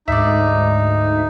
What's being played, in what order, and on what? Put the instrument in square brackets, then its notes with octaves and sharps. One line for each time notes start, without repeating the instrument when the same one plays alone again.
[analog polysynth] D2 G#2 [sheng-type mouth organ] D#4 [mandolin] D5 E5